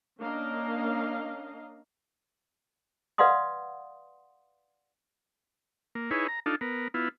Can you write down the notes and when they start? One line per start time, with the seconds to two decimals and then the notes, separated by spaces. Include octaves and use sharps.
0.20 A#3 C#4 D4 D#5 F5 A#5
3.18 B4 D5 F5 F#5 C6 D#6
5.95 A#3
6.11 D#4 E4 G#4 B4 C#5
6.28 A#5
6.46 D4 D#4 F4 A4
6.61 B3 A#4
6.94 B3 E4 F4